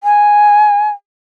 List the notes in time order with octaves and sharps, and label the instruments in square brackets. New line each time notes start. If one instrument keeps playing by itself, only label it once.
[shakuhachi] G#5